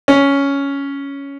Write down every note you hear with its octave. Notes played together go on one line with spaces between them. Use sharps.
C#4